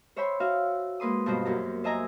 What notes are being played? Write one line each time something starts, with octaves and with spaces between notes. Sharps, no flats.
C5 C#5 E5 G5 B5 C6
F#4 E5 F5
G#3 A#3 B4 C6 D#6
G2 B2 F4 F#4 C5 B5
F#2 A#3 G4 A#5
C5 D#5 E5 G#5 A#5